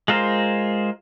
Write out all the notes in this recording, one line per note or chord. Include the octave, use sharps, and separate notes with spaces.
G#3 F4 A#4 C5